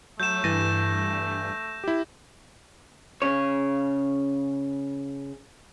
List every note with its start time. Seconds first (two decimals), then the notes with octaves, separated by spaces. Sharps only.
0.20 F#3 A3 G6 E7
0.44 G2 E3 A6 A#6 D#7
1.84 E4 G4
3.22 C#3 C#5